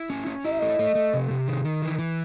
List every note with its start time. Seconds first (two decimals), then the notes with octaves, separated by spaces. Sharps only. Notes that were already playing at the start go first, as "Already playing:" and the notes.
Already playing: E4
0.10 C#4
0.27 C#4
0.44 E4 D#5
0.52 E5
0.59 A3 D#5
0.79 A3
0.95 A3
1.14 C3
1.30 C3
1.48 D#3
1.65 D#3
1.82 E3
1.99 E3